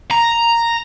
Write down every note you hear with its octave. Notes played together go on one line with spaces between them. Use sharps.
A#5